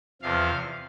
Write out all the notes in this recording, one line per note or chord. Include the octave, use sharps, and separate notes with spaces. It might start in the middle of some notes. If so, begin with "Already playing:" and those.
E2 C3 F3 F5